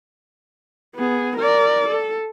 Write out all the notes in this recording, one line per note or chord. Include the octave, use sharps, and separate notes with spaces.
B3 G#4
A#4 D5
A4